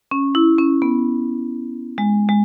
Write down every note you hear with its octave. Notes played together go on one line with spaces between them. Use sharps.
C#4
E4
C#4
B3
G#3
G#3